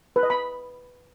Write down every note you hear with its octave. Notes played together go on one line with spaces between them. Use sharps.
B4
D#5
B5